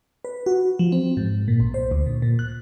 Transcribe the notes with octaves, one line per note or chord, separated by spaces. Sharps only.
B4
F#4
F3
C4
G#2
A#2
B1
C5
D2
A#2
A#2
F#6